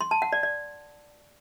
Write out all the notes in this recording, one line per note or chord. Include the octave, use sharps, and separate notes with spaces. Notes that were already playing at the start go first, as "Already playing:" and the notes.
C6
A5
F#5
D5
D5